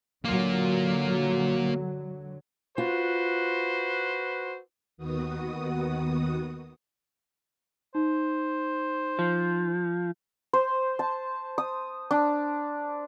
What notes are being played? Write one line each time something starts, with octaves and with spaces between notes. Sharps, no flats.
D3 F#3 A#3 F4
F4 F#4 B4 C5
D#2 D#3 B3 F#4 D#6
D#4 C5
F3
C5
A5
D#6
D4